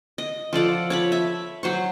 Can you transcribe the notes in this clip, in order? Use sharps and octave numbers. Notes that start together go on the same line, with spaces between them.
D#5
F3 A4 D5 F#5
C#5 A5 B5
E5
F#3 C5 C#6